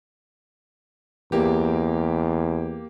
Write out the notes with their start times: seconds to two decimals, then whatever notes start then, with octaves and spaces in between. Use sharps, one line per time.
1.32 E2 A#3 G4